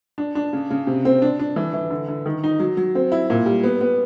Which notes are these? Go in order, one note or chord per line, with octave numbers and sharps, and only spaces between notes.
D4
D4
C#3
C#3
C3
C4
D4
D4
E3
E3
D3
D3
D#3
D#4
F#3
F#3
C4
E4
A#2
G3
B3
B3